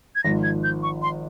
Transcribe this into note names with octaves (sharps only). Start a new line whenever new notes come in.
G#6
G#1 G#2 F3 A#6
G#6
G6
C#6
C6